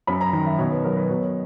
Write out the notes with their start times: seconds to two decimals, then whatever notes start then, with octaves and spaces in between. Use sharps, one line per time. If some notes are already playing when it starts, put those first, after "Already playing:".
0.07 F#2 B5
0.21 A#5
0.33 D#3
0.46 E5
0.58 B2 C#5
0.71 B4
0.84 F#3 A#4
0.97 B4
1.10 B2 C#5